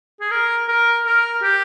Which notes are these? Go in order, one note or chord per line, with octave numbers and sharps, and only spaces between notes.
G#4
A#4
A#4
A#4
G4